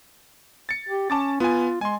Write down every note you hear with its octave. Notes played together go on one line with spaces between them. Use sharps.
A6 C#7
G4
C#4 A5 D6 A6
B3 F4 G#5
G#3 G#5 C6